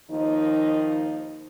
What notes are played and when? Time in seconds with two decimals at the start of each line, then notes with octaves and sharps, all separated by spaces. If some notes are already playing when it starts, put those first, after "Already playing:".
0.10 D#2 D#3 F3 D#4